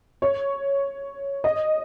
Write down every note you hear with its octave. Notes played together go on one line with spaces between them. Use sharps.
C#5
D#5